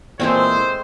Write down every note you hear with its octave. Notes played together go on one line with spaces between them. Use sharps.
A#2 E3 G#3 A3 C4 C5